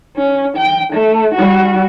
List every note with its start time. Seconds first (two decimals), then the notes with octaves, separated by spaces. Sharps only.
0.17 C#4
0.57 G5
0.93 A3
1.35 G3 F#4